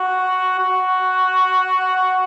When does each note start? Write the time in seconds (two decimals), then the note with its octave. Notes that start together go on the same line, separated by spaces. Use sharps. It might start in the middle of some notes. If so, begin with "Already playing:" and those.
Already playing: F#4
0.59 F#4